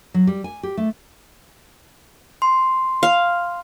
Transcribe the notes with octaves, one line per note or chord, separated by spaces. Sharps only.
F#3
G3
G#5
G4
A3
C6
F5